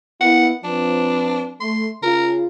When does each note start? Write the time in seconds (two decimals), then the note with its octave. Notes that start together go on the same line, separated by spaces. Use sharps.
0.21 A#3 B3 E4 F#5
0.64 F3 C4 D4 B4
1.61 A3 C6
2.03 C#3 F4 A#4